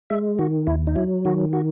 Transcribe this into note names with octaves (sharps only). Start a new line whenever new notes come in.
G#3 E5
D#3 F#4
D#2 E4
D#4
F#3 E4
D#3 F#4
F#4